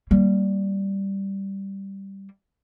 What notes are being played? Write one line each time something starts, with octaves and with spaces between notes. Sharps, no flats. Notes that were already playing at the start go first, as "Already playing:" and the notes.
G3 A#3